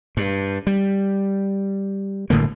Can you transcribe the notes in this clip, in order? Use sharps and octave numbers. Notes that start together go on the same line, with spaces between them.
G2
G3
G1 A2 D3 A#3